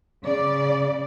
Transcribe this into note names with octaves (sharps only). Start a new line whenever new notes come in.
C#3 D5